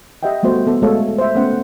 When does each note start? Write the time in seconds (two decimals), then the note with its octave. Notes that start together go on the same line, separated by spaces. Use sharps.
0.23 G4 D#5 E5 F#5 G5
0.43 G3 A3 B3 F#4 C5
0.67 B3 A4
0.82 G#3 A3 F#4 A4 C#5 F5
1.18 C5 E5
1.36 A3 B3 C#4 C5 F#5